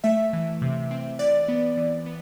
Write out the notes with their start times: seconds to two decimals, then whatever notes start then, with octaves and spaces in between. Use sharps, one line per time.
0.04 A3 E5
0.33 E3
0.62 C3
0.91 C4
1.19 E3 D5
1.48 B3
1.77 E3
2.06 B3